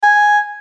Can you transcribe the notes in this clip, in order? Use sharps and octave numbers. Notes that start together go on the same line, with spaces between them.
G#5